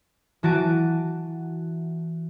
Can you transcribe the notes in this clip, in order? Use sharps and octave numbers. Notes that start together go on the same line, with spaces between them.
E3 F#4 A5 D7 D#7